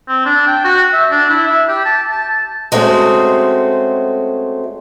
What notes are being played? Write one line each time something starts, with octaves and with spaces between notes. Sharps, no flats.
C4
D4
G5
F#4
E5
D4
E4
E5
G4
A5
A5
G#3 A3 C4 C#4 F#4